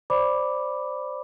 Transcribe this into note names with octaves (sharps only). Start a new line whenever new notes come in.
C5 D5 B5 D6